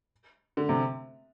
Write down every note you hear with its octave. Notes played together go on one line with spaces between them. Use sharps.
D3
C3